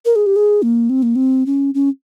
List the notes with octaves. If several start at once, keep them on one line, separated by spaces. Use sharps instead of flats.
A#4
G#4
G4
G#4
A#3
C4
A#3
C4
C#4
C#4